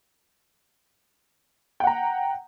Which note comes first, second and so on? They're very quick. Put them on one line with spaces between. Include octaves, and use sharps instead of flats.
G5 F#5 A#5